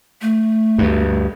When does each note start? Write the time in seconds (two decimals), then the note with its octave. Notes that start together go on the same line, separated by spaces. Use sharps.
0.22 A3
0.78 D2 G2